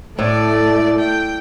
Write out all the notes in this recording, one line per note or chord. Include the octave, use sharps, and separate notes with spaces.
A2 A3 D5
G5